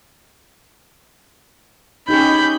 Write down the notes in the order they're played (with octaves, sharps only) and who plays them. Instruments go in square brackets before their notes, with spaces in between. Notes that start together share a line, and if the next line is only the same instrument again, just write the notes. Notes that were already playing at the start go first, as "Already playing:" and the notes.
[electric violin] C#4 G6 [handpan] D#4 G4 G#4 [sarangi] B5